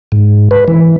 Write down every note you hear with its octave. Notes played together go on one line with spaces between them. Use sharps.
G#2
B4
E3